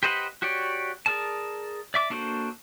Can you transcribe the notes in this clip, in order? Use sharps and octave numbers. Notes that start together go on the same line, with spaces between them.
G4 B4 C5 D#5 F#5
F#4 G4 C#5 D5
G#4 A#4 D5 A5
D5 E5 D6
A#3 D4 F#4 A4 C5